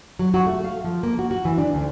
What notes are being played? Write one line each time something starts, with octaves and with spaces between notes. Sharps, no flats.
F#3
F#4
A3
F5
F3
A#3
F#4
F#4
E3
D4
D2